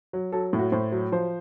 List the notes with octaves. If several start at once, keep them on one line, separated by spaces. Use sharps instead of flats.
F#3
F#3 A4
A2
F#4
A2 C5
F#3
F3 C5